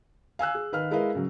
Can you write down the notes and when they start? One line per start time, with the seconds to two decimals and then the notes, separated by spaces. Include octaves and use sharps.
0.39 F5 G#5 E6 F#6
0.55 G#4
0.72 D#3 B4 F5 F6
0.91 G#3 E4 A#4 B4 D#5 F5
1.15 C#3 F#3